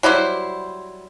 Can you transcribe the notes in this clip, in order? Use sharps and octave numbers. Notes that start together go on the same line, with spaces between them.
F#3 G3 E4 C5